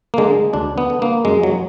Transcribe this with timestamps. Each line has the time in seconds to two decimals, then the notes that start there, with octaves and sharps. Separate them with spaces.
0.14 A#3
0.18 D3 G#3
0.53 D2 D4
0.78 B3
0.90 D3
1.02 A#3
1.25 F#2 G#3
1.43 F#3